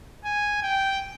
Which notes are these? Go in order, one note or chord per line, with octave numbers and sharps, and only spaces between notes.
G#5
G5